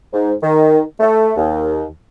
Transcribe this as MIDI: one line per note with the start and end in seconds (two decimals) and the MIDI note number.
0.13 0.32 44
0.43 0.80 51
1.00 1.31 57
1.37 1.84 39